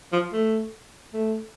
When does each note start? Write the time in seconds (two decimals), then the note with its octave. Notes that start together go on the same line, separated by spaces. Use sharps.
0.13 F3
0.33 A3
1.14 A3